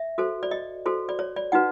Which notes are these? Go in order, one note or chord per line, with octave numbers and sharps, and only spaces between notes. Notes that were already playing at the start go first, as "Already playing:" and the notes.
Already playing: E5
F#4 A4 C5
D5
D#5
F#4 A4 C5
D5
C#5
D5
D#4 F#4 B4 F#5